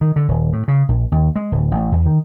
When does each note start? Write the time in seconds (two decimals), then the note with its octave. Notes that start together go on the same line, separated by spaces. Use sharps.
0.01 D#3
0.16 D3
0.28 D#1
0.53 A2
0.68 C#3
0.89 A#1
1.12 D#2
1.36 G#3
1.52 D1
1.71 A1
1.92 E2
2.06 D#3